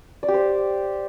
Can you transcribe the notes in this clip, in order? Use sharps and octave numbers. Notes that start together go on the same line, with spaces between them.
D5
G4
C5